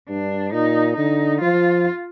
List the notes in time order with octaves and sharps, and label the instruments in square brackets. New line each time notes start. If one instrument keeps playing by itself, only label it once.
[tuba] G2 [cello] D4
[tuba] A#2 [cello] D#4
[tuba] D3 [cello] D#4
[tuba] F3 [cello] F4